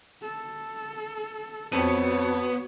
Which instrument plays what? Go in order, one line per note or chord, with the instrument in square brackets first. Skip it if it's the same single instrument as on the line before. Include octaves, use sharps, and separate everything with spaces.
[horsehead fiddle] A4
[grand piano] F2 C#7 D#7 [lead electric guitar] B3 [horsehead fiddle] F#4 C#5